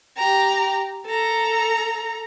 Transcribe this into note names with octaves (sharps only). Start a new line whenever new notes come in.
G4 A#5
A4 A#5